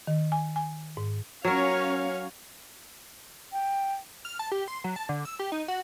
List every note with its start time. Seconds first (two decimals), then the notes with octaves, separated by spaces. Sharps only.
0.07 D#3
0.32 G#5
0.56 G#5
0.97 G#2
1.45 F#3 C#4 A#4 C#5 F5
3.52 G5
4.25 F6
4.39 A5
4.52 G4
4.68 C6
4.84 F#3
4.96 A5
5.09 D3
5.25 E6
5.39 G4
5.52 D#4
5.68 F#4